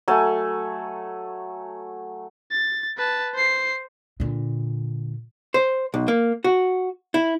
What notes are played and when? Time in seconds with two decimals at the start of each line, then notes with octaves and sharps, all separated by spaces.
0.08 F#3 A3 G#5 A5
2.51 A6
2.97 B4 A5
3.35 C5 C7
4.20 A#2 D3
5.54 C5
5.94 B1
6.08 A#3
6.44 F#4
7.14 E4